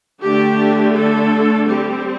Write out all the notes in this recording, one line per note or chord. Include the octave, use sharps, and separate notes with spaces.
D3 A3 D4 G4
A4
G3 C4 G4